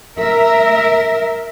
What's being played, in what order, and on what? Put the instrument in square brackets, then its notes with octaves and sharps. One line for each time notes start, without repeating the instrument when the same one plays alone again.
[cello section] A#4 E5